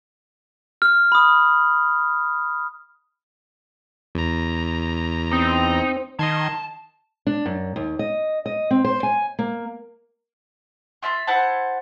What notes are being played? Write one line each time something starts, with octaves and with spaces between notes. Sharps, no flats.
F6
B5 D#6
E2 A#5
C4 D#4
D#3 D#5 A5 C6 G#6
D4
F#2
D#2
D#5
D#5
C4
C5
G#5
A#3
F4 E5 B5 C6
E4 C5 F#5 A5